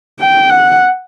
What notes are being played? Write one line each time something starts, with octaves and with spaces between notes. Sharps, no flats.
G5
F#5